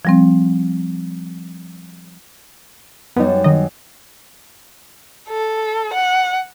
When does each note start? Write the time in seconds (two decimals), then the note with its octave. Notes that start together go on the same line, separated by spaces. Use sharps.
0.05 F3 G3 C4
3.16 F#2 G3 B3 D#4
3.44 D#3 D#5
5.29 A4
5.93 F#5